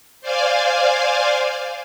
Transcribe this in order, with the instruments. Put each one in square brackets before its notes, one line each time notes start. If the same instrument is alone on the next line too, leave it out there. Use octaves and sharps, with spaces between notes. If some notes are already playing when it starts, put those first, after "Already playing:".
[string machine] C5 D5 F5 G#5